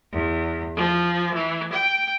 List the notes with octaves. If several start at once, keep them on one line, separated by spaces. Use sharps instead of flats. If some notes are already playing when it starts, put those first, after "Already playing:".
E2
F3
E3
G5